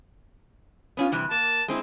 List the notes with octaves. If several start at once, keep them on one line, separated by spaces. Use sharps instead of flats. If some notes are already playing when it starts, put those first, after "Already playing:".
B3 C#4 F4
C3 E3 G3
A#3 A5
G#3 C4 E4